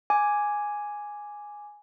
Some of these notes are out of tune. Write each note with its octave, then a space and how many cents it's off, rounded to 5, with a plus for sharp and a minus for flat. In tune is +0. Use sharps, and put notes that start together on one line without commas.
G#5 +0 D6 +0